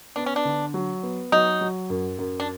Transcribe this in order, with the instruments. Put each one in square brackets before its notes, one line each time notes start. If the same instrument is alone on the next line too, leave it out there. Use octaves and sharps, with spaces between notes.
[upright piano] B3 [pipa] D4
[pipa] C#4
D4
[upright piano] D3
F#3
B3
[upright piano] F#3 [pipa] D#4
[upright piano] F#3
F#2
F#2
[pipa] D4